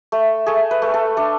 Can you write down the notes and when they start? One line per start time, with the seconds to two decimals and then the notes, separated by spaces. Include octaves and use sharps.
0.12 A3
0.46 A3 G#4
0.71 B4
0.82 A3
0.94 A4
1.17 D4 A4